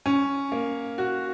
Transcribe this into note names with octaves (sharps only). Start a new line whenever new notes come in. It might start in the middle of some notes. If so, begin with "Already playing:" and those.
C#4
A#3
F#4